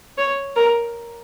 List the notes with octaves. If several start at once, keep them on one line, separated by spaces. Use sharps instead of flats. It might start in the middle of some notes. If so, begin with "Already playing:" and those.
C#5
A#4